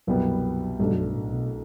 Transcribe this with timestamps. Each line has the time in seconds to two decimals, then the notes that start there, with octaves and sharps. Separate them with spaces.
0.07 C2 F#2 B2 F#3 G3 B3
0.79 B1 G2 B2 G3 A3 D4
0.91 F#2 F#3
1.03 G2
1.15 A2
1.33 B2